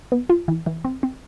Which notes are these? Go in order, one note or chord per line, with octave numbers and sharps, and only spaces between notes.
B3
F4
E3
E3
C4
C4